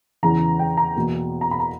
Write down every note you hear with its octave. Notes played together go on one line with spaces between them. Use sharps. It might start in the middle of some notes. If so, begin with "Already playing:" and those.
E2 C#3 E3 A#5
G5
A#5
E2 B2 A#3
A#5
B5
A#5